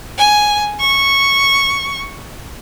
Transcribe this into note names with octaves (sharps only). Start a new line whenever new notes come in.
G#5
C#6